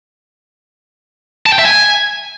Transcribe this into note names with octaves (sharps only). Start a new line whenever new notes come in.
A5
G5
E5
G#5